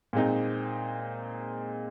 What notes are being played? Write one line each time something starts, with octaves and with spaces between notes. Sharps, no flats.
A#2 G#3 C4 D#4